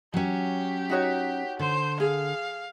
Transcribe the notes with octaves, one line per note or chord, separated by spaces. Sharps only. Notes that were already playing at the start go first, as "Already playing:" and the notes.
F#3 C#4 G4
D#4 F#4 C#5
D3 C5
G#4 F5